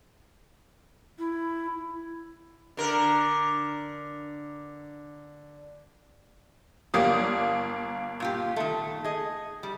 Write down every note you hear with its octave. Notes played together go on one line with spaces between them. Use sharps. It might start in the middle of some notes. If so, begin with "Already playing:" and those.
E4
D3 A#4
G1 A#3 G4 C#5 D5 D#6
A#2 F4 G4
D#3 A3
G#4 D#5
G3